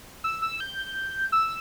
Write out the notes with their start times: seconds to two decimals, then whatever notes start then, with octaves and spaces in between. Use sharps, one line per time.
0.24 E6
0.42 E6
0.60 G6
1.32 E6